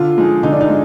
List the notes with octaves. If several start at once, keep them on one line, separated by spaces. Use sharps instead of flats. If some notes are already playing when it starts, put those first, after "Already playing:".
Already playing: D3 F4
F3 G#3 D#4
D3 D#4
D4
D#4
G#3